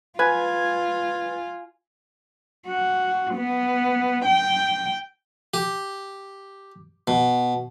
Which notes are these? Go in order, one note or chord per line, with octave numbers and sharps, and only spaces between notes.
F4 B4 G#5
F#4
B3
G5
G4
B2